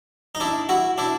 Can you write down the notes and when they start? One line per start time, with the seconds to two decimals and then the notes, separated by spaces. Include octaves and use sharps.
0.35 D#4
0.40 D4 E4
0.69 E4 F#4
0.98 D4 E4